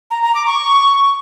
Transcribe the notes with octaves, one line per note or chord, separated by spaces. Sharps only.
A#5
A#5
D6
C#6